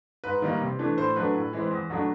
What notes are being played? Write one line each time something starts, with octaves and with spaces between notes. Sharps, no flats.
G#2 B4
D#3 G3 A#3 D#4
C3
E3 A3 D4
A2 C5
F#3 A3 D4 B4
A2
E3 G#3 C4
E2
B2 F#3 A3 D4